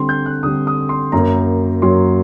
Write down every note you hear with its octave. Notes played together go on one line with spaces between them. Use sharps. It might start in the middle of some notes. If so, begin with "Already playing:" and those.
Already playing: D3 G3 C4 C6
G6
F#6
D3 G3 C4 D#6
D#6
C6
F#2 F#3 A#3 A#5
F#2 F#3 A#3 C6